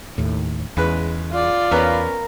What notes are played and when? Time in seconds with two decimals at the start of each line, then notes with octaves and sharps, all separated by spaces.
0.18 D#2 A2
0.77 E2 C#3 G#3 B4
1.31 F4 D5
1.71 E2 B3 C#4 A#4 B4 F5 B5